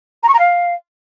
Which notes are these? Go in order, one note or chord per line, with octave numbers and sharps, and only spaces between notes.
A#5
C#6
A#5
F5